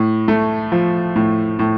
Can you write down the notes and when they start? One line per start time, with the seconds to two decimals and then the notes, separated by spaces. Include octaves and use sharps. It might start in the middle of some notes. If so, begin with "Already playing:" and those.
Already playing: A2
0.28 A3
0.72 F3
1.16 A2
1.59 A2